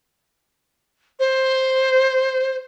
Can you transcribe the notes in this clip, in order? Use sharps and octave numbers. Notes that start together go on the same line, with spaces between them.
C5